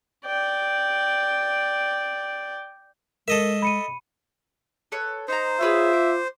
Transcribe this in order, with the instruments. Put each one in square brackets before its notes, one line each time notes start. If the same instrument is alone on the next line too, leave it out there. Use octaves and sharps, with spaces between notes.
[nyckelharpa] D5 G5
[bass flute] G#3 [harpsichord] A4 D#5 E5 [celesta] A#4
[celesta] B5 C#7 D#7
[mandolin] A4 B4 C#5
[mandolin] D#4 A#5 [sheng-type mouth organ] C5
[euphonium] F4 [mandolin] G#4 B4 C#5 [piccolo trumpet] E5
[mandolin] D6